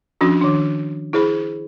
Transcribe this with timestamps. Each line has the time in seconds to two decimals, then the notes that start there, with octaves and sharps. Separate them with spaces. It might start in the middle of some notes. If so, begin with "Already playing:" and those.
0.21 F3 C#4 D4 F#4
0.41 D#3 D4
1.13 E4 G#4 C5 B5